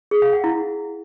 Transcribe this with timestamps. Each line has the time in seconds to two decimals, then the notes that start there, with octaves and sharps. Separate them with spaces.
0.11 G#4
0.22 F5
0.33 F#5
0.44 E4